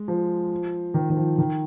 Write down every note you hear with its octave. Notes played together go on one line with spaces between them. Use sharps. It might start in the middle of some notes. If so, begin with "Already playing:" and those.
Already playing: G#3
F3
D#3
D#3
F3
D#3